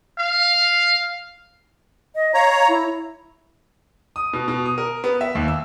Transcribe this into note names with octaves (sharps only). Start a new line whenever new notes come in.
F5
D#5
C#5 F5 A#5
E4
D#6
B2
B2
D#6
A#4
B3
E5
D#2
E6